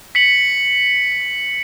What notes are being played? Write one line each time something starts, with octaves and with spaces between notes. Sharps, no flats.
B6 C#7 F#7